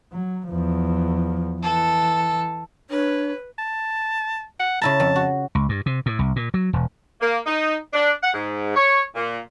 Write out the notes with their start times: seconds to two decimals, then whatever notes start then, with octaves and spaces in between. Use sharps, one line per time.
0.13 F#3
0.49 E2 F3
1.62 E3 A4
2.90 D4 B4 C#5
3.58 A5
4.59 F#5
4.81 C#3 E4 A5 A#5
5.00 F2
5.16 F#4
5.55 C#2
5.69 G2
5.86 C3
6.06 A2
6.19 C2
6.36 A#2
6.54 F#3
6.73 E1
7.21 A#3
7.46 D#4
7.93 D4
8.22 F#5
8.34 G#2
8.76 C#5
9.15 A#2